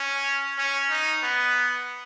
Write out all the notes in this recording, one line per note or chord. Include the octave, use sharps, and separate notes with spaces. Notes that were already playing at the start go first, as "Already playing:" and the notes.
Already playing: C#4
C#4
D#4
B3